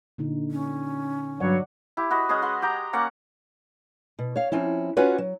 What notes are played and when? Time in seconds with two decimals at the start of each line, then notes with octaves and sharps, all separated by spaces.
0.18 A#2 D3 D#4
0.51 C#4
1.40 G2 F#3 G3 C#5 D5 F#5
1.97 E4 G4
2.10 F#4 B4 D#5
2.29 G#3 C#4 G#4 D#6
2.42 B4 F#5 C6
2.62 G4 G5 A#5
2.93 A#3 C#4 D5 F#5
4.19 B2
4.36 C#5 F5
4.52 F3 C4 C#4 E4
4.97 C#4 F4 F#4 B4 C#5
5.18 F#3